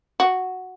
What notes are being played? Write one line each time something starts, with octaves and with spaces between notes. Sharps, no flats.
F#4